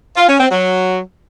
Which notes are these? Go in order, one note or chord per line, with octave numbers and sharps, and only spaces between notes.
F4
C#4
C4
F#3